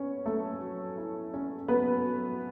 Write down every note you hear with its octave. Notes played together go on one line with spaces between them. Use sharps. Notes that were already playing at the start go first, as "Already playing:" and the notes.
Already playing: B3 C#4 B4 C#5
F#3 A3 A4
F#3
E4
C#4
F#3 B3 B4
F#3